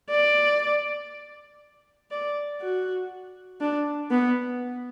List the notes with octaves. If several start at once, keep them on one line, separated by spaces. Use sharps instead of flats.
D5
D5
F#4
D4
B3